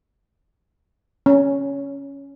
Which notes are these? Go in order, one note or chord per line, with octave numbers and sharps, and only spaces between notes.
C#4